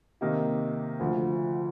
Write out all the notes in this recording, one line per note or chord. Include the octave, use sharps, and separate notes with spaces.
C3 D#3 A#3 D#4 G4
D2 D3 F3